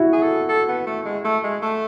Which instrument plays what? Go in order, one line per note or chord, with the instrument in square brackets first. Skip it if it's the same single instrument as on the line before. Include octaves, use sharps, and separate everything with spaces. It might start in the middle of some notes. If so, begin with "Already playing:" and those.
Already playing: [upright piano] E4 F#4
[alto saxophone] G#4
A4
A4
B3
A3
G#3
A3
G#3
A3